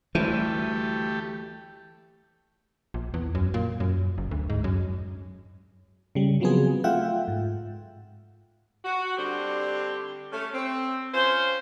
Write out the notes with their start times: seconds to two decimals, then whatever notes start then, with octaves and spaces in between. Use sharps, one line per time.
0.15 D2 E3 G3 A3 G4 C5
2.94 A#1
3.14 E2
3.35 F#2
3.54 A#2
3.80 F#2
4.18 F#1
4.31 D2
4.50 G#2
4.64 F#2
6.15 C#3 G3
6.40 C#3 F3 F#3 B3 C4 G#4
6.84 A3 F4 E5 F#5 G5
7.28 G#2
8.85 F#4
9.17 D3 G3 C4 D4 G4
10.32 A3 C#4
10.53 C4
11.14 C#4 F4 C5